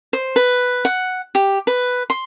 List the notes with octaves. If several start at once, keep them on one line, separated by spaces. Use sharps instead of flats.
C5
B4
F#5
G4
B4
C6